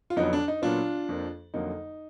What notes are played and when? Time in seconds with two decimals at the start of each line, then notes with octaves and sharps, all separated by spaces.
0.10 F4
0.16 F2 D3 F#3 B3 D#4
0.33 D4
0.48 D#4
0.62 A#2 F#3 B3 D4 F4
1.09 F2 F3 A#3
1.54 F2 D3 F#3 A#3 D#4